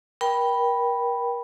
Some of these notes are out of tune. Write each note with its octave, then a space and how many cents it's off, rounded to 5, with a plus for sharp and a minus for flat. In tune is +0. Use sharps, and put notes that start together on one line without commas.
A#4 +30 G5 +0 B5 -5